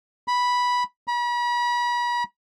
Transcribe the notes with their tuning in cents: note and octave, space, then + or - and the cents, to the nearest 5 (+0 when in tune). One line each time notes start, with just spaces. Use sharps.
B5 -5
B5 -40